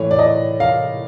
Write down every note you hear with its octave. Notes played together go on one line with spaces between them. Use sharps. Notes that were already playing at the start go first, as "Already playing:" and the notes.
Already playing: A2 E3 C#5
D5
D#5
F5